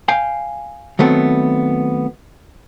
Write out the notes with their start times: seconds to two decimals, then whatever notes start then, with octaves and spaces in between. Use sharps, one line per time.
0.08 F5 G5 G#5
0.99 D#3 F#3 A3 B3 C4